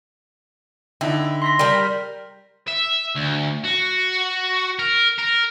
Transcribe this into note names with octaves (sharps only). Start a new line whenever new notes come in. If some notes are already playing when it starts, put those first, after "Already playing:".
D3 D#4 E4 G5
C6 A#6 B6
G3 A#4 G5
E5
D2
F#4
A#4
A#4